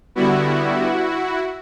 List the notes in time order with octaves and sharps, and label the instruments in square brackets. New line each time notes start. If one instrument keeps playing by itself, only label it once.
[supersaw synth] D3 G3 B3 E4 F#4